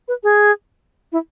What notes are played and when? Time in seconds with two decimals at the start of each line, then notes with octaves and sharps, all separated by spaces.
0.08 B4
0.24 G#4
1.12 E4